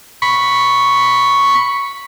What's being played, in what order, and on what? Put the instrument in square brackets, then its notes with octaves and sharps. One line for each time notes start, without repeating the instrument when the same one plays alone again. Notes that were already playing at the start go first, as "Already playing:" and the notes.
[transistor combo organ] B5 C#6